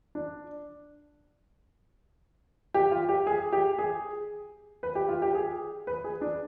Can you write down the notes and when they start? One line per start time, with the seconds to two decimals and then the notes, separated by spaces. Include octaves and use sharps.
0.15 D4
2.74 G4
2.91 F4
3.09 G4
3.27 G#4
3.53 G4
3.79 G#4
4.83 B4
4.95 G4
5.09 F4
5.22 G4
5.35 G#4
5.87 B4
6.04 G#4
6.21 D4